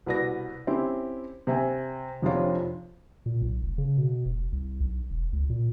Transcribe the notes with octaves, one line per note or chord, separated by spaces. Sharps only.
C2 B2 B4 D5 A#6
C4 C#4 E4 G4 C5
C3 E5 G#5
F1 F2 C3 D4 F4 C#5
A#2
B1
F1
C#3
B2
F1
C2
B1
E1
C#2
A#2